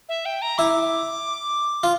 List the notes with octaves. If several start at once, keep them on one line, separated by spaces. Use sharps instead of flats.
E5
G5
A#5
E4 D6
F4